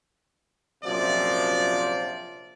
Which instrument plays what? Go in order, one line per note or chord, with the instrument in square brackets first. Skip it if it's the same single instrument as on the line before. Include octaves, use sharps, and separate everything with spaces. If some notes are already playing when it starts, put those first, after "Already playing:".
[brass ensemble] A#1 F#2 C3 F3 D5